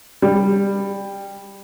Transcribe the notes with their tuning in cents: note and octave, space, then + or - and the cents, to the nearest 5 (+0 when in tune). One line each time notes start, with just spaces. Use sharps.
G3 +10